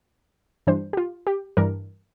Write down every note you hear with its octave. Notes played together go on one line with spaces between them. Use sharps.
G2 E3 G3 D4 C5
G4
F4
G4
G2 E3 G3 D4 A#4